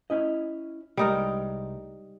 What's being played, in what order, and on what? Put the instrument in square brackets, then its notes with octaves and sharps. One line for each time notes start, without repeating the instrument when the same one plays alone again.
[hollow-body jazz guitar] C#4 E4 D#5
[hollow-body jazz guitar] C2 G#3 [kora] G3 D#4 A#4